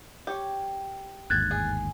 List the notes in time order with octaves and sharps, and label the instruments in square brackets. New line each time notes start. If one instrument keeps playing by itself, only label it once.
[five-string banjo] G4 C#5
[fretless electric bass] G1 D#2 G#2 [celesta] F#6 G#6 A6
[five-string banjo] G#4